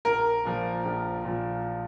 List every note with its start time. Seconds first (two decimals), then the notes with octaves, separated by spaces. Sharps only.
0.05 A#1 A#4
0.45 A#2 F3
0.85 A#1
1.25 A#2 F3